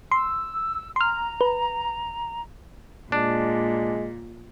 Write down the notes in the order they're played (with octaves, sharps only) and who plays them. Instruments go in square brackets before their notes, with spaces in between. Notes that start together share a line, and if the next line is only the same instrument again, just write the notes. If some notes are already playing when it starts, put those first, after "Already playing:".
[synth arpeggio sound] C6 [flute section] E6
[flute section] A#5 [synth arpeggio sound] C6 F6
[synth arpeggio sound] B4
[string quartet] A#2 [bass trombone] G#3 [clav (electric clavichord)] D4